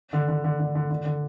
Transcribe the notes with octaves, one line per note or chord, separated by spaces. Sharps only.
D3
D3
D3
D3
D3
D3
D3